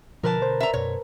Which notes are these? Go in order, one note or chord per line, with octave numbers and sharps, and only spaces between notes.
B2 D3 F3 A#4 B4 A5
C5
E5 A#5
F#2 B2 C#5